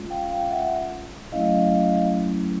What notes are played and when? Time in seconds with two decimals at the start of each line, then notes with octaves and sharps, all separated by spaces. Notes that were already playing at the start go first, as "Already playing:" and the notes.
Already playing: G#3 C#4 F4
0.10 F5 G5
0.30 F5 G5
0.51 E5 F#5
1.32 F#3 A3 C#4 E4 D#5 F5